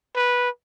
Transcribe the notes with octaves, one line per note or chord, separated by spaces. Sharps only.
B4